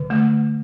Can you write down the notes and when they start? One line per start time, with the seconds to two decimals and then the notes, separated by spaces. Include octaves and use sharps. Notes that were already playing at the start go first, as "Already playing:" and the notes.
Already playing: D3
0.10 A3